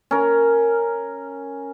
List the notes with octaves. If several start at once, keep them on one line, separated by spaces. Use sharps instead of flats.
C#4 A#4